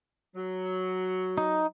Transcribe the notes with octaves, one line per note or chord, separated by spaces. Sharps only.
F#3
D#4